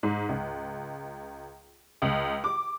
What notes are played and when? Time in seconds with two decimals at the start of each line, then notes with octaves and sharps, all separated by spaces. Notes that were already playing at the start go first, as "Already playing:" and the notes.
0.03 G#2
0.29 C#2
2.02 C#2
2.44 D6